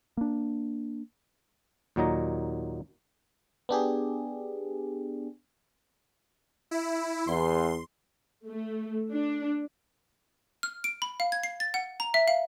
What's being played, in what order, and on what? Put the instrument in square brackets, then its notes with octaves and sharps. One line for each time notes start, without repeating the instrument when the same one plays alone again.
[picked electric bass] A#3 D4
[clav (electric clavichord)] D#2 A#2 F#3 D#4 A#5
[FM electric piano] B3 D4 G4 G#4
[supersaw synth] E4
[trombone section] E2 [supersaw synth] C6
[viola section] A3
D4
[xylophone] F6
D7
B5
F5
G#6
C7
A6
F#5
A#5
E5
F5